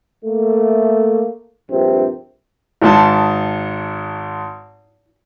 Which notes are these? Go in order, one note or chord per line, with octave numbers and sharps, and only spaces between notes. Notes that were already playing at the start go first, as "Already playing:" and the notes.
A3 A#3
A#1 G2 C3 C4
G#1 G#2 A5